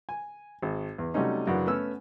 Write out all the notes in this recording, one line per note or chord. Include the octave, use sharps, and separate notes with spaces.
G#5
G#1
E2
C3 F#3 G3 A3 C#4 D#4
F#2 C#3 E3 F#3 D4
A3 B3 C#4 E6 F6